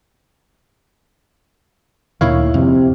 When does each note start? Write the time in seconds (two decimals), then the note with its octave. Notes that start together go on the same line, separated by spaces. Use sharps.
2.21 D2 A#2 D#3 E4 C#5 F5
2.54 F2 C3